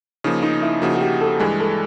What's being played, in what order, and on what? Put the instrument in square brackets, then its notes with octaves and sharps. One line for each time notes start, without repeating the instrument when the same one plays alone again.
[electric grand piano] C#3 F3 A#3 [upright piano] D#4
[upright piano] D#4
E4
[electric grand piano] C#3 F3 A#3 [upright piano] F#4
[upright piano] F#4
G4
A4
[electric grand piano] G2 E3 G#3 [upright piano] G#4
[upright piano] A4